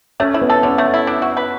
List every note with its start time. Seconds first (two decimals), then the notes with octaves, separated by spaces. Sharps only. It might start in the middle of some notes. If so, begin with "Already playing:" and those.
0.20 A3 C#4
0.34 E4
0.41 B3
0.50 A4
0.63 D3 C#4
0.78 A3
0.94 E4
1.07 D4
1.22 F#4
1.37 B4